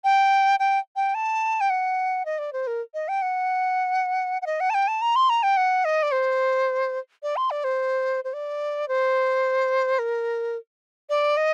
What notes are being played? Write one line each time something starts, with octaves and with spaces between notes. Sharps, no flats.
G5
G5
G5
A5
G5
F#5
D#5
D5
C5
A#4
D#5
G5
F#5
F#5
D#5
F#5
A5
G5
A5
A#5
C6
A#5
G5
F#5
D#5
D5
C5
D5
C6
D5
C5
C5
D5
C5
A#4
D5
D#5